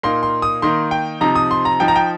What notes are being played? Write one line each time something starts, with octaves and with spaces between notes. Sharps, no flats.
A#2 A#3 D#4 C6
C6
D#6
D#3 A#3 D#4 C6
G5
C3 F3 D#4 A#5
D#6
C6
A#5
F3 D#4 G5
A#5
G5